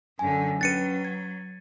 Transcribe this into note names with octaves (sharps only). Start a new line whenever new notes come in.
F#2 D3 G#5
F#3 C#4 B4 A6 C#7 D#7
G#6